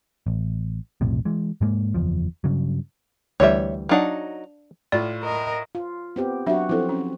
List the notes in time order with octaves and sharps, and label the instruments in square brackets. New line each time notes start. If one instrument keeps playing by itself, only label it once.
[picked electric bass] A1
B1 F2 A2 C3
E3 G#3
G#2 G#3 A#3
F#1 E2 F3
G2 C#3 F#3
[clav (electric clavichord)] D2 E3 G3 [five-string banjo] C#5 E5
[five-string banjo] F#3 D#4 F#5 [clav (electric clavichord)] D4 F5
[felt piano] A2 F4 [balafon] D5
[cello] A#4 D#5
[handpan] F4
B3 C4 G4
[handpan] F#3 F#4 [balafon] D4 E5
[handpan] F3 C4 [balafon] E4 A4
[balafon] C#4